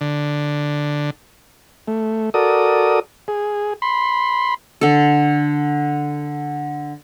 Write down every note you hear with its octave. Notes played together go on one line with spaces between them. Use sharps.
D3
A3
F#4 A4 A#4 D5 D#6
G#4
B5 C6
D3 A4